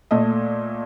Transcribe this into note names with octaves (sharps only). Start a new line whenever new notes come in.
A#2 A3 D#5